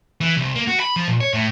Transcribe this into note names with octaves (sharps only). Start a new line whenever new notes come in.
E3
C2
A#3
F#4
B5
F3
A#2
C#5
A2